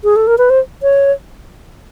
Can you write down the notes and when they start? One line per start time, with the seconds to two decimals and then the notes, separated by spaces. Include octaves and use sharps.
0.04 G#4
0.16 A4
0.27 A#4
0.38 B4
0.50 C5
0.83 C#5